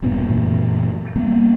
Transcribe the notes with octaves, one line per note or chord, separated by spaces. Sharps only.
E1 G2 A#2 B3
F#2 A#2 E3 A3
G3 A#3 B3